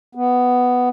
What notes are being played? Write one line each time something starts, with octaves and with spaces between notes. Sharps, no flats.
B3